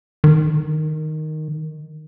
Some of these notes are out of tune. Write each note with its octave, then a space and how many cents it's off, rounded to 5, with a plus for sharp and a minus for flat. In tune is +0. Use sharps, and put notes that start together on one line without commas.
D#3 -5